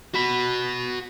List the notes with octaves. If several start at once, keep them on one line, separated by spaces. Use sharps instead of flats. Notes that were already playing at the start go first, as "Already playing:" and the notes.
F#4 B5